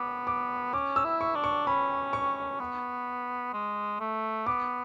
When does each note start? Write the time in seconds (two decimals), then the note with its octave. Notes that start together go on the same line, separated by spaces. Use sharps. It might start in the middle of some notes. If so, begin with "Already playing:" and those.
Already playing: B3 D6
0.27 D6
0.73 C#4 D6
0.96 E6
1.05 E4
1.21 C#6
1.35 D4
1.44 C#6
1.67 C#4 B5
2.13 C#6
2.60 B3
3.53 G#3
4.00 A3
4.46 B3 D6